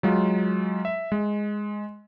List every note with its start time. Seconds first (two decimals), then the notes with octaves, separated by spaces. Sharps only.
0.03 F#3 G#3 F4
0.85 E5
1.12 G#3